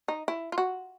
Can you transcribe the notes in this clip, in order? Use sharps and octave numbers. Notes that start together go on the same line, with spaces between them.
D#4
E4
F4
F#4